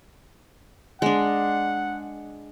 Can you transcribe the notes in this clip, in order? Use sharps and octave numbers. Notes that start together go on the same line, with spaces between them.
G#3 D4 F#5